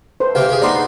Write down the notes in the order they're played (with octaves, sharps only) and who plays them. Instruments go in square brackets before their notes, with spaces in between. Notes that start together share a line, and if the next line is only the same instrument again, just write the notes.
[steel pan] A4 B4 C5
[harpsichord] C3 G4 G5 [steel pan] F5
[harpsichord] G4 G#4
[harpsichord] B3 D#4 A#5 [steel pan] D5 C6